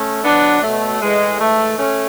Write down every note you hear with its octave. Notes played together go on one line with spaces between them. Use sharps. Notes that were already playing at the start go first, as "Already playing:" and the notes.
Already playing: A3 C#4
B2 F#3 B3 D4
B2 F#3 A3
A2 E3 G#3
G#2 E3 A3
A3 C#4